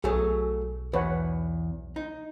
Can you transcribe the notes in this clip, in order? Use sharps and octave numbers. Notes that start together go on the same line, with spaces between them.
B1 F#3 A3 G#4
E2 B4 C#5 F#5
D#4